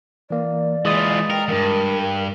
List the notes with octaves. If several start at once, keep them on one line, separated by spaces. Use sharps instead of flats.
E3 A#3 D5
E3 G#3 F4 D#6 A6
A#4 G5
E2 G2 A#4